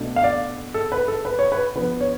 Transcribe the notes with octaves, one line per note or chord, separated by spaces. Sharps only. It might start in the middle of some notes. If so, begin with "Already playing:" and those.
Already playing: B2 A3 D4
F5
D5
A4
B4
A4
B4
C#5
B4
F3 B3 D4 B4
C#5